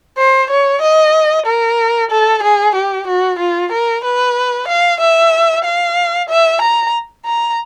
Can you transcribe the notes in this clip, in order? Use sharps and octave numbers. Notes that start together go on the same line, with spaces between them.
C5
C#5
D#5
A#4
A4
G#4
G4
F#4
F4
A#4
B4
F5
E5
F5
E5
A#5
A#5